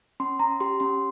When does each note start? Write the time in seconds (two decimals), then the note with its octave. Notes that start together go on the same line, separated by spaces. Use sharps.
0.20 C#4 C6
0.39 C#4 A#5
0.60 G4 C6
0.80 C#4 C6